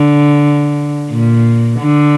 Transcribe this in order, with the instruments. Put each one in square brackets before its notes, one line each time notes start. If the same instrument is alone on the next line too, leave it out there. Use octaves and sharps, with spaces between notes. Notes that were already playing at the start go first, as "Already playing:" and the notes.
Already playing: [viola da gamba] D3
A#2
D3